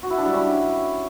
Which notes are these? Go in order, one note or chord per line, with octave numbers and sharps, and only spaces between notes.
F#4
E4
D4
G3
C#4